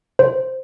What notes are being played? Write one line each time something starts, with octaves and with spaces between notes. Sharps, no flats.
C5